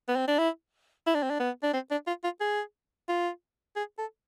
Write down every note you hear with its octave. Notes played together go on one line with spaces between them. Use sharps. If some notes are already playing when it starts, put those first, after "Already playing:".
B3
C4
D4
E4
E4
D4
C4
D4
B3
D4
C4
D4
F4
F4
G#4
F4
G#4
A4